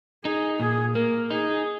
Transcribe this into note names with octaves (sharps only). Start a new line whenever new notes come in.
D#4 G#4
A#2 G#4
A#3 A#4
D#4 G#4